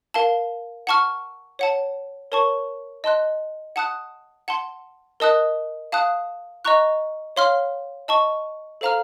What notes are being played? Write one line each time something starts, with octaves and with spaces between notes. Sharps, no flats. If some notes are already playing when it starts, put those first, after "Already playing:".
A#4 F5 A5
F#5 A5 C#6 F6
C#5 F#5 A5
A#4 C#5 A5 C#6
D#5 A5 C6 F#6
F#5 A5 D#6 F#6
F#5 A5 C6
A#4 D#5 A5 D#6 F#6
F5 A5 D#6 F#6
D#5 A#5 C#6 F#6
C#5 F5 C6 F6
D#5 A5 C#6
A4 C5 F5 A#5 F6